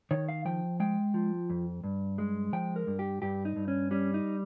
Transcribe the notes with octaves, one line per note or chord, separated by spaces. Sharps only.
D#3 C#5
F5
F3 G5
G#3 G5
F3
F2
G2
G#3
F3 G5
A#4
G2
G4
G2 G4
D#4
G2
C#4
G3 C#4
D#4